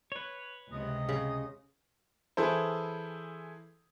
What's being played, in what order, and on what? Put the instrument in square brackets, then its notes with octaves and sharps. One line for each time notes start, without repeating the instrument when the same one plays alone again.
[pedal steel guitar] B4 C#5
[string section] C#2 C3 [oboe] D#5
[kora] C#3
[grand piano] E3 E4 G#4 A4 C5